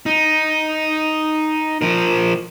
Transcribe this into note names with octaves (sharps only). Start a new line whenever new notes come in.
D#4
F3 A#4